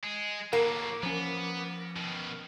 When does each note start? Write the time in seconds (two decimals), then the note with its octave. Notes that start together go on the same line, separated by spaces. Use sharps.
0.04 G#3
0.53 A2 F#3 A#3
1.03 F3 B3 C#4
1.96 B2 D#3